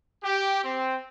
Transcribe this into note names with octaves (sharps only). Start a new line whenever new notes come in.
G4
C4